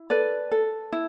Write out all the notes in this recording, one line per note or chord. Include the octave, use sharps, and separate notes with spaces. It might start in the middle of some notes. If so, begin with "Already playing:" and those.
Already playing: E4
A4 B4 D5
A4
E4